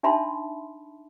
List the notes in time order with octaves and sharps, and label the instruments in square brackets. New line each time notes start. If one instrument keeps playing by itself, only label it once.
[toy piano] D4 D#4 E5 A5 B5 C6